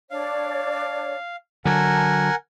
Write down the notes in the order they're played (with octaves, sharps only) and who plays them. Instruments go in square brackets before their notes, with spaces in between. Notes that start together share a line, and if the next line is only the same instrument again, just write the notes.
[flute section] D4 C#5 D5 [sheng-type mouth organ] F5
[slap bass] D3 F#3 [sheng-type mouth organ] A#4 F#5 G#5 [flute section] A5